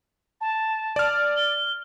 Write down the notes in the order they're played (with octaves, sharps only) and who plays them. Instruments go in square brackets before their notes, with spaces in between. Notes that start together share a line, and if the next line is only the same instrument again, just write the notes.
[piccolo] A5
[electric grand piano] D5 F6
[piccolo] G7